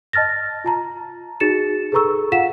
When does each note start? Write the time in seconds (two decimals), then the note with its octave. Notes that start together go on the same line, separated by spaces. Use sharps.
0.13 D#5 A5 F6 A6 A#6
0.64 F4 A5 A#5
1.40 D#4 F#4 G#4 A6 C#7 E7
1.92 G#4 A4 B4 A#5 C#6 E6
2.32 F4 F5 F#5 B6 E7